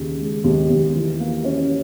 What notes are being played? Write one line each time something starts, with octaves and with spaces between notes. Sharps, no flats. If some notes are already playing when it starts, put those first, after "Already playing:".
Already playing: D#2 C#3
G#3
D#2
D#2
E3
A#3
C#4